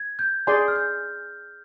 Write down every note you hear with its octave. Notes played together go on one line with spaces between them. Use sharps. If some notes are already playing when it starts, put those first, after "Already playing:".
Already playing: G#6
G6
G#4 D5 G#5 C6 G6
F6
G6